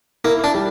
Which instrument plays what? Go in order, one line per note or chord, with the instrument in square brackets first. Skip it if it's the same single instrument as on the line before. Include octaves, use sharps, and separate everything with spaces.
[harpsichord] A#3 [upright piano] E4
[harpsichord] D4
[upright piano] G3